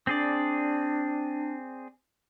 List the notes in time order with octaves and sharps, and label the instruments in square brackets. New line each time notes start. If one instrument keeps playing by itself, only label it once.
[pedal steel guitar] C4 G#4 D5 [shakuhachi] D4